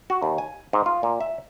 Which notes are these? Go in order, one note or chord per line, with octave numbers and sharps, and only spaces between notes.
F#4
D#2
G#5
G#2
F4
A#2
E5